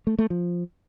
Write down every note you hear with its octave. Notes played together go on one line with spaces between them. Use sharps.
A3
A3
F3